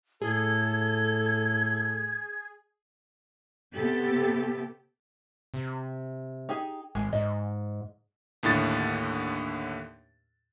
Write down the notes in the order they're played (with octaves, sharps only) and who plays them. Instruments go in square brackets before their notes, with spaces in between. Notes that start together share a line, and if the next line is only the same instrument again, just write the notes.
[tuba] A2 [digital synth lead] G#4 [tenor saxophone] A4 [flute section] G#6
[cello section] C3 B3 G4 A4
[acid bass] C3
[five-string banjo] D#4 G4 G#4
[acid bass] G#1 [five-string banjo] G#3
[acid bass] G#2 [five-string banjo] D#5
[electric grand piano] D#2 A2 D3 A6